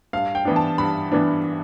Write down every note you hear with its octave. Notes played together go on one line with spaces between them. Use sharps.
G2 F5
G5
E3 B3 D4
A5
G2 B5
E3 B3 D4